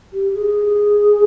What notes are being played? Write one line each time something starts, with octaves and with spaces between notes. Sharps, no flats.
G4
G#4